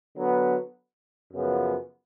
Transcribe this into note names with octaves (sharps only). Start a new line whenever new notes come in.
D3 F#3 B3
F#2 C#3 F3 B3